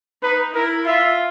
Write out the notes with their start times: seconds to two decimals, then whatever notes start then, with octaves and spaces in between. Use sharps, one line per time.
0.22 D#4 B4
0.54 E4 A#4
0.86 F4 E5